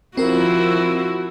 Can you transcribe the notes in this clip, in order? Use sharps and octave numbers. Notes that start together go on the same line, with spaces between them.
F3 C4 E4 F#4 A#4